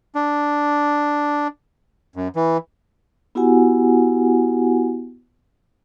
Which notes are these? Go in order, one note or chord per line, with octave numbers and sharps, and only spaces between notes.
D4
F#2
E3
B3 E4 F#4 G4 F#5 G#5